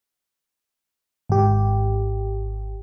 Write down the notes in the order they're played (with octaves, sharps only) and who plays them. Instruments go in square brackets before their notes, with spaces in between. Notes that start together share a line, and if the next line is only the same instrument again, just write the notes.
[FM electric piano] G#1 G4